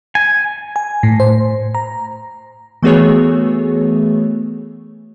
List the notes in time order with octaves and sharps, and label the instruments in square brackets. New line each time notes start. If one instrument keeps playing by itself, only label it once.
[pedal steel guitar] G#5
[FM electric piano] G#5
A2
C5
A#5
[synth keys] E3 A3 B3 F#4 G#4 C#5